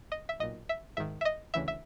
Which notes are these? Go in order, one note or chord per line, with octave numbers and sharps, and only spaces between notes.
D#5
E5
B1 A#2 D#5
E5
G#1 G#2 D#3 E5
E5
D#5
D2 C#3 E3 E5
E5